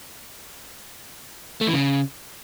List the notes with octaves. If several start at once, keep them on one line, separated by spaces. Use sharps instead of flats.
A3
E3
C#3